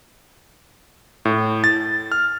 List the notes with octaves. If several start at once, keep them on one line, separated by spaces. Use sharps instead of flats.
A2
A6
F6